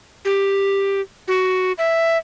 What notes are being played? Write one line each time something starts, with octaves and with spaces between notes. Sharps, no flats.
G4
F#4
E5